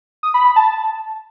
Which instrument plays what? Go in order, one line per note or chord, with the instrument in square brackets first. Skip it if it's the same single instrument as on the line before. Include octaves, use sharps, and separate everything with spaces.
[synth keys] D#6
B5
B5
A5